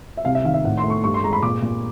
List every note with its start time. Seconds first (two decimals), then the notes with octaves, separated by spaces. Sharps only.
0.17 E5
0.25 C2 F5
0.35 E5
0.44 D#3 F5
0.54 E5
0.65 A2 F#5
0.78 C6
0.84 A3
0.90 C#6
1.04 G2 C#6
1.14 C6
1.23 G#3 A#5
1.33 B5
1.43 A#2 D6
1.62 A#2